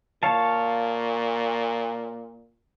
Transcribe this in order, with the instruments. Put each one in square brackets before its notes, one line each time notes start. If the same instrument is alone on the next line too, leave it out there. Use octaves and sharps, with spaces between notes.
[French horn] A#2 [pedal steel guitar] C#5 F5 A5